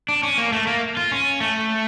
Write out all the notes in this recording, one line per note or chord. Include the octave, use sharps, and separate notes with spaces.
D4
C#4
A#3
A3
A#3
F4
C#4
A3